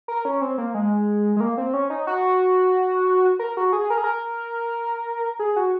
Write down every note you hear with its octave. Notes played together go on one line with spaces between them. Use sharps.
A#4
C#4
C4
A#3
G#3
G#3
A#3
C4
C#4
D#4
F#4
A#4
F#4
G#4
A#4
G#4
A#4
G#4
F#4